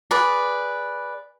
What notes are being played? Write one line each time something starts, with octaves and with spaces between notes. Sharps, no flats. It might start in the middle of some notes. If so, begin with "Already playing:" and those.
G#4 B4 D5